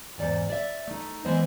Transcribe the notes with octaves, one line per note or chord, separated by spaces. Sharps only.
E2 G#2 D5
D5 E5
A3 D#4
E3 G#3 B3 C5 D#5